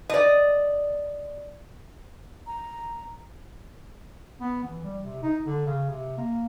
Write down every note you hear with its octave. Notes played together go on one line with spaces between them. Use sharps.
D5 D#5
A#5
B3
E3
G3
C3
D#4
D3
C#3
C3
A#3